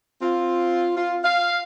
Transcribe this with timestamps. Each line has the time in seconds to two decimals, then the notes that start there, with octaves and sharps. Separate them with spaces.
0.22 C4 F4
0.96 F4
1.24 F5